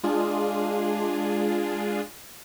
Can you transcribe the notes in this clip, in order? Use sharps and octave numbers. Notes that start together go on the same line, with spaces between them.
G#3 D4 F4 G#4